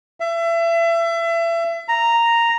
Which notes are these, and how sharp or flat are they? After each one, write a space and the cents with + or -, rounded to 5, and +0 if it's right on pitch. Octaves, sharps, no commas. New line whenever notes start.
E5 +30
A#5 -5